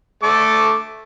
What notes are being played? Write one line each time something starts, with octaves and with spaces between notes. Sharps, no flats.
A3 A4 D6